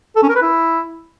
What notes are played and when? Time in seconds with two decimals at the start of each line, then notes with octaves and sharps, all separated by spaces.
0.16 A4
0.23 C#4
0.29 A#4
0.35 B4
0.42 E4